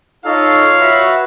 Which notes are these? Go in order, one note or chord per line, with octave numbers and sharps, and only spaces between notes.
D#4 F4 A4 C#5 F5
F#4 B4 E5